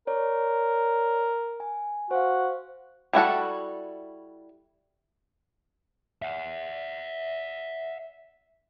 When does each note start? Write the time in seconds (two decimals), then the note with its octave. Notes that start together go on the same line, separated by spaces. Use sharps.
0.07 A#4 C#5 D5
1.60 G#5
2.11 F#4 C5 F5
3.13 G3 E4 F#4 A4
6.22 E5 F#5